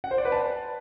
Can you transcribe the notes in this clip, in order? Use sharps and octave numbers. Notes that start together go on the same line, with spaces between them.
F#5
C5
D5
B4
A5